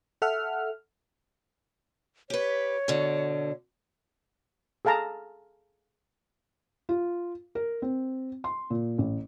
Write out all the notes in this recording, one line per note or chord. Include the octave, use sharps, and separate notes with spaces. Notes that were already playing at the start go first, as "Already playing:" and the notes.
A4 E5 F#5 F6
G4 B4 C#5
B2 D3
G#4 A4 F5 A5 A#5
F4
A#4
C4
C6
A#2
A1